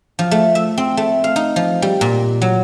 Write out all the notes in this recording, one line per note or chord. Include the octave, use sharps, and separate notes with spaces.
F3
A3
E5
C4
A3
F5
D#4
F3
G3
A#2
F#3